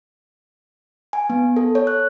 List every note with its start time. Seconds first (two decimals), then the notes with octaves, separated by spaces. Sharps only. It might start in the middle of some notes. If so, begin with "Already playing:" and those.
1.13 G#5
1.30 B3
1.57 A4
1.75 C#5
1.87 F#6